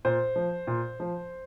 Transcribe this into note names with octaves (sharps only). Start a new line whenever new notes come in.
A#2 C5
F3
A#2
F3